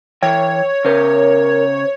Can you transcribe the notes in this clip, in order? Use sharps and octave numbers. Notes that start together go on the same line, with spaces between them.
E3 C#5 G5
C#3 A#4 C5